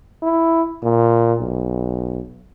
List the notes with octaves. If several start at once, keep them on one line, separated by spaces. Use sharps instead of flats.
E4
A#2
B1